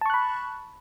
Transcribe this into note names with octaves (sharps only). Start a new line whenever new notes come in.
A5 B5 C#6 F#6